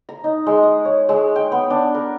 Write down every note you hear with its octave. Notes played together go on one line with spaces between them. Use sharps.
A#5
D#4
G#3
D#6
C#5
G#3
G5
B3
D4
A#4